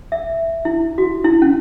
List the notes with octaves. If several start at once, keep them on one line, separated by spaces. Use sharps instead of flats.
E5
E4
F#4
E4
C#4